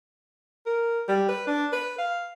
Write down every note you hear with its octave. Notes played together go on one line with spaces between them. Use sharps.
A#4
G3
B4
D4
B4
F5